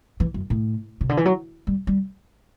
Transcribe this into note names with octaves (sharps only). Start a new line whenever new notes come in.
E3
F#2
A2
C3
D3
E3
F#3
G3
G3